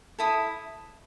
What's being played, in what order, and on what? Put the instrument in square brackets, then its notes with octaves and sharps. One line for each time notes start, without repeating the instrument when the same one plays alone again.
[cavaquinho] E4 A4 D#6